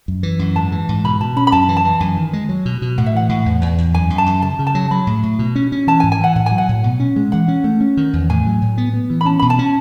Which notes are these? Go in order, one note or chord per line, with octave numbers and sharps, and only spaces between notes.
F#2
E3
F#2
G#2 A5
E3
G#2
B2 B5
B2 A5
C#4 B5
B5
F#2 A5
E3
A5
E3
F#2 G#5
D#3
G#3
F#3
B2
B2
A2 F#5
E5
E3 F#5
A2
E2
E2
E2
F#2 G#5
F#2
A5
F#2
C#3 A5
C#3
A5
F#3
F#3 B5
A2
A2
B2
C#4
C#4
E3 A5
G#5
G#2
G#5
E3 F#5
A2 F#5
G#5
F#3
F#5
A2
B2
C#4
G#3
E3 F#5
C#4
A3
C#4
D#3
E2
A2 G#5
F#3
A2
B3
B3
E3
B5
C#4 A5
B2 B5
A5
C#4